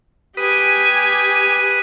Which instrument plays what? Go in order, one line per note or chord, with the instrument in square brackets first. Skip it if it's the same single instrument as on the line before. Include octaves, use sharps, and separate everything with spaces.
[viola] G4 G#5 [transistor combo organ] B4 D#6